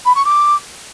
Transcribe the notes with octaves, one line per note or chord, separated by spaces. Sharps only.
B5
C#6
D6